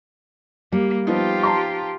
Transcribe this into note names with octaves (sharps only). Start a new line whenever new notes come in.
G3 A#3
F3 B3 D#4 F4 G4
A5 A#5 C6